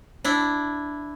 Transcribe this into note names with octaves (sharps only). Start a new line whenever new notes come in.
D4 E4